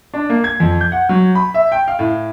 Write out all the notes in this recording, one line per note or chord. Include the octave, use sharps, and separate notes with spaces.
D4
A#3
G#6
F2
G6
F#5
F#3
B5
E5
G5
F5
A2